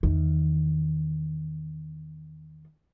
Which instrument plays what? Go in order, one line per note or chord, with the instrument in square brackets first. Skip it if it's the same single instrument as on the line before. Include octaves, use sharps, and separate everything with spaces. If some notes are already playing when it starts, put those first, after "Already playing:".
[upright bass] E2 D#3